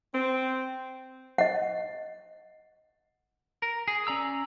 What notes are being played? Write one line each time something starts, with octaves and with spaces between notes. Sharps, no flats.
C4
D#5 F#5
A#4
G#4
C#4 D5 A#5 E6